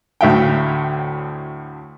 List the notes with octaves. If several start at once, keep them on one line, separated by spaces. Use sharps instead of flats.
D2 A2 F#3 E5 F5 G5